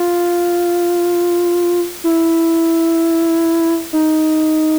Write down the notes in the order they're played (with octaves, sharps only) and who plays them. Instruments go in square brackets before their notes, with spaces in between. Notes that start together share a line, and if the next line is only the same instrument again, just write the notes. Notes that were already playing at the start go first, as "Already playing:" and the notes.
Already playing: [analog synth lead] F4
E4
D#4